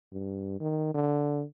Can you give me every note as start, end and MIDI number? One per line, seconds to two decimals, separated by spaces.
0.12 0.55 43
0.60 0.90 51
0.94 1.43 50